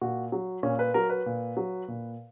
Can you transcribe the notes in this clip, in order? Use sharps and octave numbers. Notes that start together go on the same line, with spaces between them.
A#2 F#4
F#3
A#2 C#4
B4
F#3 A#4
B4
A#2
F#3
A#2